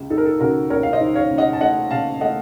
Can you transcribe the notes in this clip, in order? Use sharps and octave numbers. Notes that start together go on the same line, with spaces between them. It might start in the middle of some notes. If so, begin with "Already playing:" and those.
Already playing: C#2
D#4 A4
A#4
A4
C#3 F#4 A#4
C#2 A#4 C#5
F5
C5 D#5
D#4
C#5 F5
C#2
D#5 F#5
A5
A3 D#5 F#5
C#3 F5 A5
A3 D#5 F#5